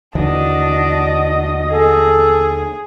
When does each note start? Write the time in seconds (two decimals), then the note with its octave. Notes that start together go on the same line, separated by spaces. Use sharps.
0.15 D#2 D3 E3 D4 F#4 D#5
1.72 G#4 A4